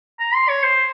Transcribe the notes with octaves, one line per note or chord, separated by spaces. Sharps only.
A#5
C6
C#5
C5